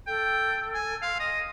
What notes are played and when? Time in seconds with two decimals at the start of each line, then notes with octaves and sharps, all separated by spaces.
0.07 A4 G5
0.74 G#5
1.02 F5 C6
1.20 D#5